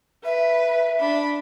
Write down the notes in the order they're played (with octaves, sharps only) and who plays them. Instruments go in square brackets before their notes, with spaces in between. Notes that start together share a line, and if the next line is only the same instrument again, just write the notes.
[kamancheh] B4 [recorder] E5
[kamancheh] D4 B5